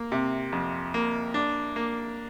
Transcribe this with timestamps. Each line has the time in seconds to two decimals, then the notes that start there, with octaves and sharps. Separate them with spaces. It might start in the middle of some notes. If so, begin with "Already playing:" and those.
Already playing: A#3
0.12 C3
0.52 F2
0.94 A#3
1.34 D4
1.76 A#3